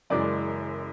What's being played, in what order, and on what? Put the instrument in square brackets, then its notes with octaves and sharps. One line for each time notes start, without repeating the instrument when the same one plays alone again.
[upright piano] F#1 F#2 E3 G#3 D5